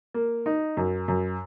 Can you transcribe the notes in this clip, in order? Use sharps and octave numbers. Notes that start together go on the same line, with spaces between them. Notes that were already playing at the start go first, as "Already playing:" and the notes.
A#3
D#4
F#2
F#2